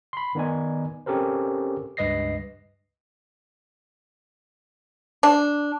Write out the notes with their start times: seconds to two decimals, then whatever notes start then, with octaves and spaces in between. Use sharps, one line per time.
0.13 B5 C6
0.35 D#3 B3 D#4 D5 G#5
1.06 C4 C#4 G4 A4 A#4 C5
1.97 C#2 G2 B4 D#5 A#6 C7
5.23 D4